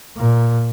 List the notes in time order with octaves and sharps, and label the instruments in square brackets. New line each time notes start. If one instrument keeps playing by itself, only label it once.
[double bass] A#2